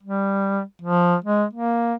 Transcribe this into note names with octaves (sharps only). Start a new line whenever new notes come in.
G3
F3
G#3
A#3